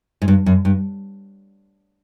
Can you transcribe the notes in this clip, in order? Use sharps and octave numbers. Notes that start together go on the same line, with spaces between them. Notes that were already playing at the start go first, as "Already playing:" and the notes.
G#2
G2
F#2
G2